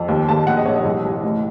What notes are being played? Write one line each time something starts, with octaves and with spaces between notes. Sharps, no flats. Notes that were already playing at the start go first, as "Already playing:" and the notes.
Already playing: F2
D#2
D#2 A5
A#1 F#5
D#5
A#1 C#5
D#5
C2
C2
A1